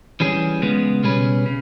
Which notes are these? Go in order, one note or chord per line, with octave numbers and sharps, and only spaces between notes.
E3 G3 C#4 G#4
C#3 G#3 B3
B2 G3 C#4 G#4 B4
C#3